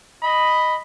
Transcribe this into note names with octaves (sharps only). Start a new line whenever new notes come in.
D#5 B5